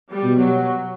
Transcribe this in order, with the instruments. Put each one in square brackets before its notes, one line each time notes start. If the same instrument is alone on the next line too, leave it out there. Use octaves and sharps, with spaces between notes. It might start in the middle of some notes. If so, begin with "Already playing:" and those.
[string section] G3
[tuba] B2
[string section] F#3